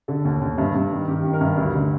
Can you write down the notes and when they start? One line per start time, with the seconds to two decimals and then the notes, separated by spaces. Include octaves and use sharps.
0.08 D3 A4
0.25 D#2
0.41 D#2
0.58 G2
0.75 G2
0.92 D#3
1.08 D#3 G4
1.25 D#3
1.33 A#4
1.41 G2
1.58 D2
1.74 D3